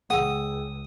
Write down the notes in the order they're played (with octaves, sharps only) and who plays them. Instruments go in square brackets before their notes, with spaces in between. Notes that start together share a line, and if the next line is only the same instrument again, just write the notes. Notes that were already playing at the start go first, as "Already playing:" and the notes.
[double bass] C#2 [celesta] G#4 G5 E6 [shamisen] F#5 [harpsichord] D#6